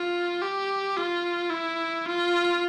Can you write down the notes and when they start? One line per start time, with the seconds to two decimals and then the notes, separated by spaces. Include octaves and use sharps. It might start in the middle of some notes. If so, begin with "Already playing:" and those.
Already playing: F4
0.42 G4
0.97 F4
1.50 E4
2.06 F4